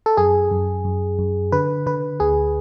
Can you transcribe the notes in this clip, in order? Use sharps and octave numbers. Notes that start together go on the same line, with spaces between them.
A4
F#2 G#4
F#2
F#2
F#2
D3 B4
D3 B4
D2 G#4